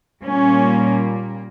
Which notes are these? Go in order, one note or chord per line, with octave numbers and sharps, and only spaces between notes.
A#2 G3 A#3 C#4